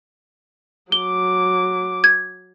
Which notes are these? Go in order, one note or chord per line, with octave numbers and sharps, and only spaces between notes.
F#3 D6 G7
G#6